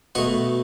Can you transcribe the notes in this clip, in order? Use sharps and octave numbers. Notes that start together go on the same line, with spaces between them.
B2 A3 D#5 F#5